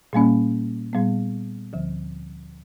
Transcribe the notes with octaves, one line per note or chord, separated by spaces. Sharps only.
A#2 G3 A#3 C#4
A#2 G3 B3
D2 D3 F3